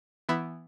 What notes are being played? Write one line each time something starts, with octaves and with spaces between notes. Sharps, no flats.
E3 B3 E4